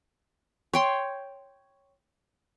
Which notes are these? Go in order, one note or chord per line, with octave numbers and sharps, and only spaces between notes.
C#5 G5 C6